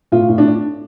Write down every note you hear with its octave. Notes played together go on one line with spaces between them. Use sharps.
A2 F4
A2
D4